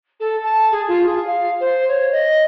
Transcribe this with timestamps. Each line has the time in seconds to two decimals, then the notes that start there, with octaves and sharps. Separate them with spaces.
0.20 A4
0.43 A5
0.71 G#4
0.88 F4
1.06 G#4
1.27 F5
1.60 C5
1.88 C#5
2.12 D#5